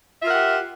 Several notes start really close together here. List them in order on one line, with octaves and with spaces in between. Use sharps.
E5 F4 A#4 F#5 G4